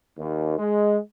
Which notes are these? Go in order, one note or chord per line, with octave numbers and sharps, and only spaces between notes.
D#2
G#3